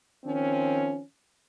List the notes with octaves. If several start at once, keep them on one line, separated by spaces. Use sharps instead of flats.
D#3 F3 C4 C#4